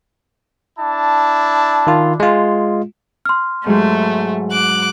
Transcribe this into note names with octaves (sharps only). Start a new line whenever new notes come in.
D4 E4 A5
D#3 F4
G#3 F4
C6 F6
G#2 F#3 A3 G#4
D6 F#6